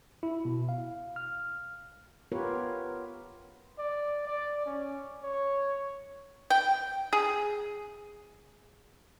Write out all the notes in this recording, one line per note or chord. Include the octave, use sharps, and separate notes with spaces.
E4
B2
F5
F6
B3 F4 G4 A#4 B4 C#5
D5
D5
C#4
C#5
G5
G#4